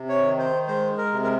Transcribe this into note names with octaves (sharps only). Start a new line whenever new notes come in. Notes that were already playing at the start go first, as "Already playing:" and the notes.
Already playing: C3
C#5
D#3
C5
G#3 C5
A#4
C3
A#4